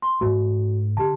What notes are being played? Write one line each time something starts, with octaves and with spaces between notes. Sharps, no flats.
C6
G#2 A3 F#4
D3 G4 A5